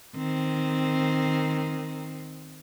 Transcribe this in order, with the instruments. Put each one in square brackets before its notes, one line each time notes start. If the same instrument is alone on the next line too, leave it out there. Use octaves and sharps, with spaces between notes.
[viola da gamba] D#3 C4